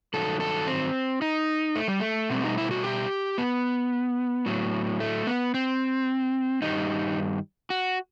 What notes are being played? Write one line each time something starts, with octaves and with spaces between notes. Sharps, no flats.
G2 D#3 F#3 A4
A4
C4
D#4
A3
G3
A3
B2 G3 C4
D#4
E4
F#4
G4
B3
A2 F#3
A3
B3
C4
G2 D#3 G3 D#4
F#4